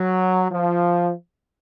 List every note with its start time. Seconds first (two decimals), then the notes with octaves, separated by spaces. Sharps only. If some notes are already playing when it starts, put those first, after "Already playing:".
Already playing: F#3
0.50 F3